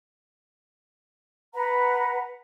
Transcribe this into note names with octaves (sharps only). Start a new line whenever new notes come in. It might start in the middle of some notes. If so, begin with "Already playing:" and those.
B4 F#5 A#5